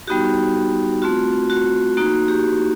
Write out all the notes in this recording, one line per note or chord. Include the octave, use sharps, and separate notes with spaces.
G3 B3 D#4 F#4 G4
A3 C4 F4 F#4
F#4
A#3 D#4 F#4
G4